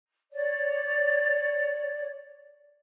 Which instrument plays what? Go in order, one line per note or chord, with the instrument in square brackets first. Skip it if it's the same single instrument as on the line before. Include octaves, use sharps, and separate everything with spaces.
[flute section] C#5 D5